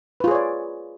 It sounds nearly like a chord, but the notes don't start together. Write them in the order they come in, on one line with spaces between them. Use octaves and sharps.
B4 F4 G#4 C#5 D5